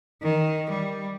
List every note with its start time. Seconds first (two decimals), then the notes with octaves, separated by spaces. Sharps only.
0.22 D#3
0.71 G3